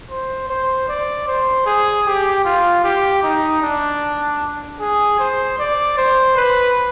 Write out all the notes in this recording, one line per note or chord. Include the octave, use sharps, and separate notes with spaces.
C5
C5
D5
C5
G#4
G4
F4
G4
D#4
D4
G#4
C5
D5
C5
B4